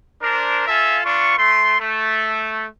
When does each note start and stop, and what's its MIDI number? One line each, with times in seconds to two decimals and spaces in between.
0.22 0.65 62
0.22 0.65 70
0.22 0.65 72
0.67 1.01 65
0.67 1.01 69
0.67 1.01 76
0.67 1.01 77
0.67 1.01 80
0.67 1.01 81
1.04 1.37 59
1.04 1.37 62
1.04 1.37 65
1.04 1.37 85
1.38 1.78 57
1.38 1.78 84
1.80 2.65 57